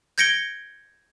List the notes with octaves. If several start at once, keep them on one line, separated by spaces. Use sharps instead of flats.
G6 G#6 A#6 C#7 D7 G7